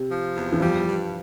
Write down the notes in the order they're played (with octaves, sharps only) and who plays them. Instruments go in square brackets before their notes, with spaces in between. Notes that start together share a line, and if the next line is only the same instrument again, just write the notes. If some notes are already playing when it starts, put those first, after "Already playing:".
Already playing: [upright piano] C3
[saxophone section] F3
E2
[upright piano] E3
[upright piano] F3 [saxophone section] G3
[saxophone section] G2